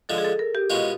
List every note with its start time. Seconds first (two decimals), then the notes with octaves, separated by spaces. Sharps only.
0.09 D3 F3 G#3 A4
0.18 G#4
0.24 A4
0.39 A#4
0.55 G4
0.70 B2 G#3 C#4 F4